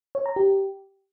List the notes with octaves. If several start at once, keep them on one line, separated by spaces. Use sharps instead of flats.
C#5
A#5
G4